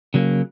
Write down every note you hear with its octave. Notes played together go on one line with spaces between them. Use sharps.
C#3 F#3 A#3